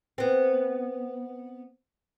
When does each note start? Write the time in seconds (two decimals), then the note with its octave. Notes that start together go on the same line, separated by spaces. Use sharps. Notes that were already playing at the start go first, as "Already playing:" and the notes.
0.18 B3 C4